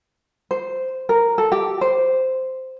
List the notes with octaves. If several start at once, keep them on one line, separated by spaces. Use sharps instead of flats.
C5
A#4
A4
G4
C5